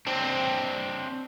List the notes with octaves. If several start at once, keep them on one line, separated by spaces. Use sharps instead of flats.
C4 D4